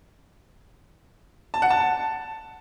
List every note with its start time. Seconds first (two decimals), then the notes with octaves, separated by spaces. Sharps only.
1.54 A5
1.62 F#5
1.70 A5